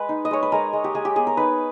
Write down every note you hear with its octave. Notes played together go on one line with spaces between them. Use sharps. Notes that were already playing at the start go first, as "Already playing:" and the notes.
Already playing: G#3 B4
D#4
D#5
G#3 C#5
B4
G#3 A#4
G#3
G4
G#3 G#4
G4
B3 G#4
A#4
D#4 B4